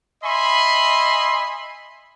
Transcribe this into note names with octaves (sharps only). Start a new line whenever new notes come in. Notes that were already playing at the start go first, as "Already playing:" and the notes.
D#5 E5 G#5 B5 C6